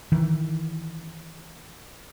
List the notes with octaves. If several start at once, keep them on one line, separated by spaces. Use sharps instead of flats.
D#3 E3